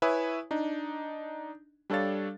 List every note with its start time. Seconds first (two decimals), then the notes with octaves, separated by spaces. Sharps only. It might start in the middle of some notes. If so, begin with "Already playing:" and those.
0.02 E4 B4 C#5 E5 G#5 D#6
0.51 D4 D#4
1.90 G3 D4 A4 C#5 F5 A6